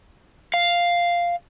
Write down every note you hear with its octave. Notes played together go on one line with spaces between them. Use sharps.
F5